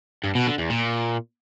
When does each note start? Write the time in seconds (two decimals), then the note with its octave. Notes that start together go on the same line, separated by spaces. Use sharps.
0.24 G2
0.35 B2
0.47 D3
0.58 E2
0.70 A#2